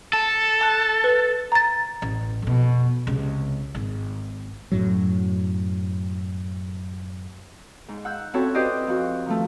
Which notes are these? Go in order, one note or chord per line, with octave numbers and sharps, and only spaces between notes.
A4 A5
A5 F#6
B4
A#5 A6
A1
F2 B2
C#2 C3
G#1
F#2 A2 F#3
G#2
F#5 E6 G6
C4 C#4 E4 F#4 A4 C#5
E4 G4 B4 C5 D5 D#5
F2 F#4
D#3 F3 A3